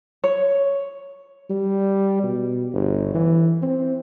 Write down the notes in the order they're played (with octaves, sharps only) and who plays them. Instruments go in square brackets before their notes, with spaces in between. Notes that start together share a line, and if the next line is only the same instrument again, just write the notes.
[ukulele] C#5
[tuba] G3
B2
G1
E3
C4